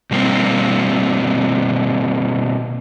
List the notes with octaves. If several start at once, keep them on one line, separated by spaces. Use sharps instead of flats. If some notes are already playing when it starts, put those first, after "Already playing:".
B2 G3 A#3 C4